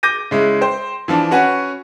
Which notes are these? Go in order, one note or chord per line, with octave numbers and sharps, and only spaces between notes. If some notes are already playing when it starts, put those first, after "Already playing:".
D6 G6 A#6 D#7
C#3 G#3 E4
C5 G5
E3 F3 D4
C#4 F#4 B4 F#5 G#5